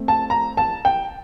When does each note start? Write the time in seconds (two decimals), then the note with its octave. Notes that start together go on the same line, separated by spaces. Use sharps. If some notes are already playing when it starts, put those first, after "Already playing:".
Already playing: A3 C4
0.08 A5
0.30 A#5
0.57 A5
0.85 G5